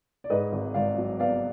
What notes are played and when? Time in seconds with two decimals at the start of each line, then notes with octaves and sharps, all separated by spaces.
0.24 D5
0.30 G#2 B4 D#5
0.52 G#1
0.74 G#1 D5 F5
0.98 F#3
1.19 B3 D5 F5